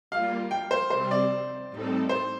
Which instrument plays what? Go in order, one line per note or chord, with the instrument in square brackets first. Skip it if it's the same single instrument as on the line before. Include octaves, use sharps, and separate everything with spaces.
[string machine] G3 A#3 F4 [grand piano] F5
[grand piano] G5
C5
[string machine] C3 G3 C4 [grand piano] C5
[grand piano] D5
[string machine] A2 G3 C4 D#4 A4
[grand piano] C5